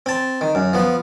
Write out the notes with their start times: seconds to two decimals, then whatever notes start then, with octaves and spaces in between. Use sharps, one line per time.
0.06 C4 A5
0.41 D#3
0.55 F#2
0.73 F3 B3